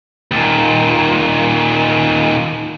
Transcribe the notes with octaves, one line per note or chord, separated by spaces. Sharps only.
D#2 A#2